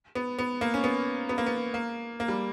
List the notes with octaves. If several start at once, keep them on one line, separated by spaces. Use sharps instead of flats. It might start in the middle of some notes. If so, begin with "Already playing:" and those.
B3
B3
A#3
C#4
B3
B3
A#3
B3
A#3
A#3
G3